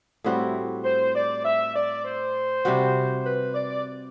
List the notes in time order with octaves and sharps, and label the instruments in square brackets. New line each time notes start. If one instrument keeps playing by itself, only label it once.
[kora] A2 G3 C4 F#4 [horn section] E4
[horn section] C5
D5
E5
D5
C5
[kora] C3 G3 C4 F#4
[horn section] B4
D5